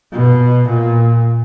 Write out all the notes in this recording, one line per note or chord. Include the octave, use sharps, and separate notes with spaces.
B2
A#2